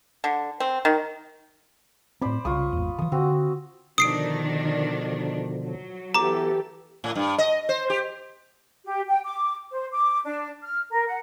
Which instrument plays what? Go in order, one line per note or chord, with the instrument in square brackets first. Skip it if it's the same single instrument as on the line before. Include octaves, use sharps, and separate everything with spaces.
[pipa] D3
C4
D#3
[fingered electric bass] A2 C4 [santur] C5 D5 B5
[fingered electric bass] C2 C#3 [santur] F4 C#6 D#6
[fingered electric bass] G#1 E2
[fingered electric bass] D3 E3 [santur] D#6
[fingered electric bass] D3 [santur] C4 F#4 F#5
[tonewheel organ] B2 D3 F3 [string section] D#3 D4 [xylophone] D#6 C7 D7
[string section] F#3
[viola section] E3 G4 A4 [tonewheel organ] B3 [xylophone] A#5 D6
[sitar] A2
G2
D#5
C5
G4
[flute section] G4
G5
D6
C5
D6
D4
F6
A#4
F#5